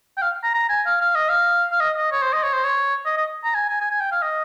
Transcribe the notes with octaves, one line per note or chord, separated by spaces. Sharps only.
G5
F5
A#5
A#5
G#5
F5
F5
D#5
F5
F5
D#5
D#5
C#5
C5
D#5
C#5
C5
C#5
D#5
D#5
A#5
G#5
G#5
G#5
G#5
G5
F5
D#5